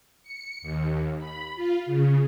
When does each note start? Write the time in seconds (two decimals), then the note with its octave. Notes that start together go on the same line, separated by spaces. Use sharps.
0.23 C#7
0.62 D#2
1.18 B5
1.55 F4
1.86 C#3